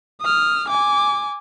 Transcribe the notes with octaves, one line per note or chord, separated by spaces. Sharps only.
D#6 F6
G#5 D6